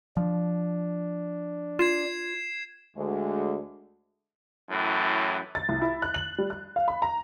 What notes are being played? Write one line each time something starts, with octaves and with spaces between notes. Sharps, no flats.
F3 D4
F4 G#6 C7 E7
D2 G#3
F#2 A2 E3
A6
C2
E4
F#6
F#7
G3
F#6
F5
B5
A#5